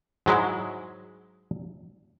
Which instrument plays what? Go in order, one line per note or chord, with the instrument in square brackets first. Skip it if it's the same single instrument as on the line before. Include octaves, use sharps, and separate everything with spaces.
[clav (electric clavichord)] G#2 F#3 G#3 E4